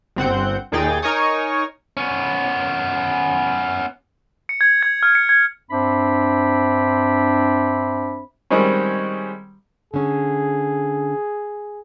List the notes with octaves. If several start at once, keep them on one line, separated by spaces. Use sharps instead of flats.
G1 C4 F#5 G6
D#2 A#2 D#4 G#4 G5 A6
D#4 A#4 C#5 G#5 C#6 D#6
B3 C#4
C#7
G#6
G#6
F6
C#7
G#6
G2 C4 D4 C5 E5 B5
D#3 G3 G#3 C4 C#4
D3 C#4 G#4